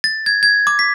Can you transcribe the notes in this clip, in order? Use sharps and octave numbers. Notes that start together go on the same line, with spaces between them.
A6
G#6
G#6
D6
B6